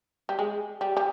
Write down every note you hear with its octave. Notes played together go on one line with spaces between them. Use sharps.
G3
G#3
G3
G3